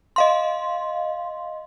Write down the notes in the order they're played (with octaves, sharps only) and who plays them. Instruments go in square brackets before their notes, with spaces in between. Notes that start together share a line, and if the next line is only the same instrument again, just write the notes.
[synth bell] D#5 F5 C6